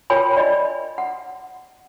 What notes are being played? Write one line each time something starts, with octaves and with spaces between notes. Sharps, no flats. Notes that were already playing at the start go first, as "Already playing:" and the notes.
F4 A#4 C#5 G5 G#5 B5
D5 D#5 B5
F#5